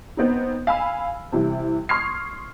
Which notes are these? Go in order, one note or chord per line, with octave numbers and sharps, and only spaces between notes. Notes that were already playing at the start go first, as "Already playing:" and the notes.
B3 C4 D#4
F5 G#5 B5 E6
C3 E3 G3 E4
C6 C#6 D#6 F6 G#6 C7